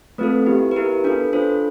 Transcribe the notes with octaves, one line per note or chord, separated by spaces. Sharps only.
A3 C4 F4 A4 B4
B3 E4 G4
B4
B3 E4 G4 A#4
D4 F4 A4 B4
D4 F4 A4 C5